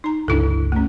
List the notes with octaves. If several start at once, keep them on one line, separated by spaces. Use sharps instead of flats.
D#4 A#5
G1 C#2 D4 E4 A4
A3 C#4